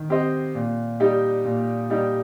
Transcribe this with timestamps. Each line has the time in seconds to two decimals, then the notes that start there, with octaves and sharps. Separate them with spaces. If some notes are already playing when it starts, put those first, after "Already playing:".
Already playing: D#3
0.10 C4 G4 C5 D#5
0.55 A#2
1.00 G3 D#4 G4
1.45 A#2
1.90 G3 D#4 G4